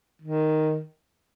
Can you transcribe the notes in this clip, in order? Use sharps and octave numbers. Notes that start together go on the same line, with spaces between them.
D#3